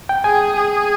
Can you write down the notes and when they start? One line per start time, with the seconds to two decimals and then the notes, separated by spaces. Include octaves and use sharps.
0.09 G5
0.24 G#4 G#5
0.56 G#4